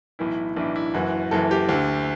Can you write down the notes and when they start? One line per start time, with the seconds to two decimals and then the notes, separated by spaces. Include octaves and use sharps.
0.19 B1 A2 E3 E4
0.57 B1 A2 E3 D4
0.76 E4
0.94 F#1 F#2 E3 F#4
1.31 F#1 F#2 E3 A4
1.51 G4
1.69 D2 D3